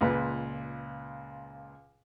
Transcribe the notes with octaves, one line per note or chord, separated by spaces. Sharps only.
C#2 A#2 B4